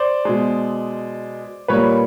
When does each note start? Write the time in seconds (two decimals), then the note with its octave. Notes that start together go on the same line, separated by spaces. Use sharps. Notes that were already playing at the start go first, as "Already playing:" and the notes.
Already playing: C5 D5
0.25 B2 G#3
1.68 A#2 G3 A#3 B4 C#5